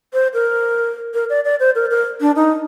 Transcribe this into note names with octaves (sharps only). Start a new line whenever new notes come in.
C5
A#4
A#4
D5
D5
C5
A#4
A#4
D4
D#4